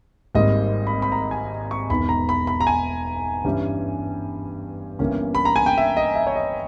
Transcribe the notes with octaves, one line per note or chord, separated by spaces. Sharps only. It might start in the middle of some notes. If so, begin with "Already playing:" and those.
G#1 G#2 G3 A#3 D#5
B5
B5
A#5
G#5
C#6
E1 E2 D#3 B5
A#5
B5
B5
A#5
G#5
G2 E3 G3 C#4
G1 G2 E3 A#3 C#4
B5
A#5
G#5
G5
E5
D#5
E5
C#5
D#5